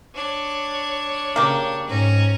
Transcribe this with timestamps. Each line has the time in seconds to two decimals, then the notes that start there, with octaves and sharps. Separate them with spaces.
0.14 D4 C#5
1.36 C#3 A#3 G4
1.87 G#2 C#4 A#5